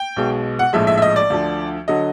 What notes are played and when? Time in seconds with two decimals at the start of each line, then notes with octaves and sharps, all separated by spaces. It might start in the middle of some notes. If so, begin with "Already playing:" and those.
Already playing: G5
0.16 B1 B2 G#3
0.59 F#5
0.73 A#1 A2 F3 G#3 E5
0.87 E5
0.97 E5
1.02 D#5
1.16 D5
1.30 D2 D3 F3
1.88 D3 F#3 D#5